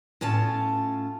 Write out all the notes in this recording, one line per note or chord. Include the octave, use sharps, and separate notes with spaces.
A2 C#4 F4 A5